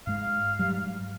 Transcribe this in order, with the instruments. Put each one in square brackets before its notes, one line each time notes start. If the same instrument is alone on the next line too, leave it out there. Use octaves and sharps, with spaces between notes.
[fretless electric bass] G#2 G#3 [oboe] F5
[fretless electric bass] G#2 F#3 G3